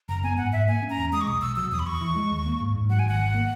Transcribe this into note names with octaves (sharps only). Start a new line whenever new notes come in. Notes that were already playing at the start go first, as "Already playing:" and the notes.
F#1 A#5
B3 G#5
G#2 F#5
G#2 E5
A#3 G#5
C#4
A#5
E2
G#3 D#6
C#6
B1 D#6
B1 E6
F#3 E6
E2 D#6
B5
E2 C#6
E3
G#3
D#2
A#3
G#2
G#2
F#3 F#5
G#5
G#1 F#5
G#1
A#3